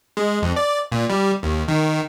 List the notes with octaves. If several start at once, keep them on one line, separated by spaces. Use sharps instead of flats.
G#3
F2
D5
A#2
G3
D#2
D#3